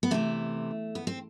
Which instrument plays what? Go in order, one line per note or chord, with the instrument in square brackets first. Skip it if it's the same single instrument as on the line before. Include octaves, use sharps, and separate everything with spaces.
[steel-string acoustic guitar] B3
C3 E3 A3
B3
C4